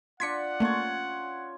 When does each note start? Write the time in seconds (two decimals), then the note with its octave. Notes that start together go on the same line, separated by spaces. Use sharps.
0.20 D4 F4 F#5 G#6 B6 C#7
0.60 A3 A#3 C#4 F4 C#5